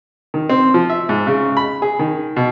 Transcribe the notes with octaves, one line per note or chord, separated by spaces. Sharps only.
D#3
C4
F3
E5
G#2
C#3
B5
G#4
D#3
B2